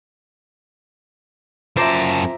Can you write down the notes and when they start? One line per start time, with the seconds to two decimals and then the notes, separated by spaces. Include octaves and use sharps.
1.77 F#2 F4 C5 E5 A5 A#5 D6